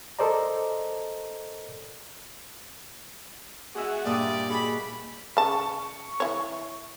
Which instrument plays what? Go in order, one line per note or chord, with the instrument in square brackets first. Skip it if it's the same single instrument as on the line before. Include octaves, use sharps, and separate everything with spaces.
[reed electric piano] A4 A#4 C5 D5 D#5 A#5
[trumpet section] G#3 B3 F#4 [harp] G#4 E5
[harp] G2 A#2 D#6 [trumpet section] G3 G4 D5
[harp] D#4 G#4 [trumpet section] F#4 B5
[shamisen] C#3 A5 [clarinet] C#6
[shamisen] E3 C#5